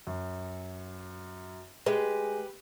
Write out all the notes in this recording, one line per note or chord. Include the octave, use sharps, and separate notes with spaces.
F#2
G#3 G4 B4